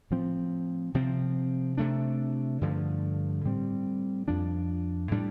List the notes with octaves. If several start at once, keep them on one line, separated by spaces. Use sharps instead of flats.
A2 F3 C4
C3 F3 C4
C3 A3 D4
G2 D3 F3 A3
A2 G3 C4
F2 F3 D4
A2 G3 D4